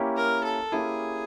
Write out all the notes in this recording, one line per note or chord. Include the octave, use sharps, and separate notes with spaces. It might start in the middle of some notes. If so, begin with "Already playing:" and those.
Already playing: A#3 C#4 E4 G4
A#4
A4
A#3 C#4 E4 G4 G#4